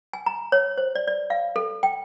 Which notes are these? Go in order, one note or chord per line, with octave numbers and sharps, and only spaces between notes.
G#5
A#5
C#5
C5
D5
D5
F5
A4
G5